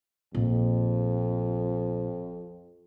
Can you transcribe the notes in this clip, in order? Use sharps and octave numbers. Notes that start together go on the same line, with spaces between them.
A#1 F2